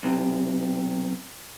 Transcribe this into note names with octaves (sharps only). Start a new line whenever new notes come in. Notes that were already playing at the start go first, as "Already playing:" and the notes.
B1 C3